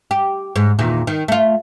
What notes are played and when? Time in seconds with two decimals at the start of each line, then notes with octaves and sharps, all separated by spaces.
0.11 G4
0.56 G#2
0.79 E2 A#2 D#3
1.07 D#3
1.28 A3 F4